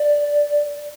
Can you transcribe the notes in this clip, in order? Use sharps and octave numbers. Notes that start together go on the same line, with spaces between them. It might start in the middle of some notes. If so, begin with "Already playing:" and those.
Already playing: D5